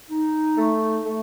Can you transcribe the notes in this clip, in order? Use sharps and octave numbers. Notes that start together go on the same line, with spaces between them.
D#4
A3
A3